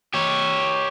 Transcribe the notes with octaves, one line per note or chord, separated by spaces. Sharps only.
G4 C#5